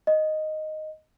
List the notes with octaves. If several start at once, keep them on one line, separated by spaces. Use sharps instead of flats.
D#5